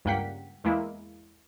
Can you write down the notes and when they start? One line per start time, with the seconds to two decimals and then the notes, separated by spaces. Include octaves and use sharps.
0.05 C#2 G2 A#3 F#5 G5 B6
0.64 E2 G#3 A#3 E4